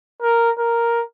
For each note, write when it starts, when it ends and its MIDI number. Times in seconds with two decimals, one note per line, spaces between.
0.22 0.51 70
0.58 1.02 70